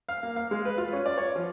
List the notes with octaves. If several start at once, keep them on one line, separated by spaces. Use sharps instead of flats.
F5
A#3
F5
G#3
B4
F4
C#4
D5
C#5
F3